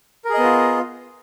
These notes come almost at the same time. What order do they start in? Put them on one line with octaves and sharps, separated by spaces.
A#4 G#4 D#5 B3 F4